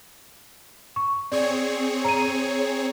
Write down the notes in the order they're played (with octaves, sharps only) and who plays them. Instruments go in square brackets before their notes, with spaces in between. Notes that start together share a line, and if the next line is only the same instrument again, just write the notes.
[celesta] C#6
[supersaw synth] C4 G#4 C#5 [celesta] D5
[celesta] A#5 D#7